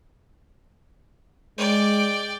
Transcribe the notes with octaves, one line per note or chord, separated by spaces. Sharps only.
G#3 D5 G5